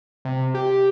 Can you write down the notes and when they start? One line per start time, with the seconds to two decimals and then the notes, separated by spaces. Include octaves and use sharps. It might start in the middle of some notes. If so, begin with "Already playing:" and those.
0.25 C3
0.54 G4